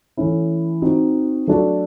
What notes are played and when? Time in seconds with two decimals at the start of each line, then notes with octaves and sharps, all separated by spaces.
0.17 E3 A3 C#4 E4
0.82 C4 D#4 F#4
1.47 F#3 A3 D4 F#4 A4